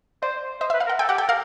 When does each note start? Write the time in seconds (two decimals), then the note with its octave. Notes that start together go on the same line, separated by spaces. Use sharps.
0.23 C5 D5
0.61 C5 D#5
0.70 E5
0.74 B4
0.80 F5
0.87 A#4
0.89 F#5
0.99 A4 G5
1.09 G4 F#5
1.18 A4 G5
1.28 A#4 F5